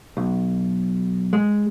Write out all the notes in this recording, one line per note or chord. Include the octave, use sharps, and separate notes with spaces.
B1
G#3